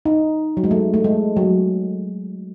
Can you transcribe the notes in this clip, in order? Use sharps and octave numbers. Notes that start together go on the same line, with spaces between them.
D#4
F#3
G#3
A3
A3
G#3
F#3